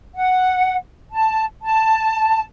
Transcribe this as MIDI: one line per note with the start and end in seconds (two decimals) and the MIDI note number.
0.15 0.75 78
1.11 1.44 81
1.61 2.43 81